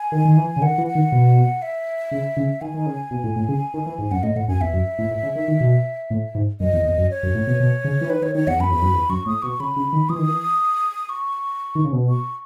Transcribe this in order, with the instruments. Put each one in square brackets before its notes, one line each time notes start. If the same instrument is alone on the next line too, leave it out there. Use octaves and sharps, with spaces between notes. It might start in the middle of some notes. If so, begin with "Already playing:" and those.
Already playing: [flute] G#5
[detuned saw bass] D#3
D#3
E3
C#3
[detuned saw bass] D#3 [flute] F#5
[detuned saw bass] E3
[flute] F#5
[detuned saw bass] D#3
B2
[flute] E5
[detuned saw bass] C#3
C#3
[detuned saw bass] D#3 [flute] G#5
[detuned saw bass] D#3
C#3
B2
A2
A2
C#3
D#3
E3
G#2
[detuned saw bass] F#2 [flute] F#5
[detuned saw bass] A2 [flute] D#5
[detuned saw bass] A2 [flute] F#5
[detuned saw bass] F#2 [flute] G#5
[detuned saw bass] E2 [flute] E5
[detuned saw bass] F#2
A2
A2
C#3
D#3
D#3
B2
A2
G#2
[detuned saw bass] F#2 [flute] D#5
[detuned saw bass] E2
E2
F#2
[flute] C#5
[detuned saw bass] F#2
A2
B2
B2
C#3
E3
[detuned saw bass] D#3 [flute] B4
[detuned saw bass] D#3 [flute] C#5
[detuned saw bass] D#3 [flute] C#5
[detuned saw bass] E2 [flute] F#5
[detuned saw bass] F#2 [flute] B5
[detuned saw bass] E2
F#2
E2
[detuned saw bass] F#2 [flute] C#6
[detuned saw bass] A2 [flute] D#6
[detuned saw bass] B2 [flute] C#6
[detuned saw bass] C#3 [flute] B5
[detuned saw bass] C#3
D#3
[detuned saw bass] E3 [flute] D#6
[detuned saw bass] D#3
E3
[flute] C#6
[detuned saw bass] D#3
C#3
B2
[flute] C#6